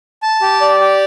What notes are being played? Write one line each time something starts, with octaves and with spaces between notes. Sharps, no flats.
A5
G4
D5
G4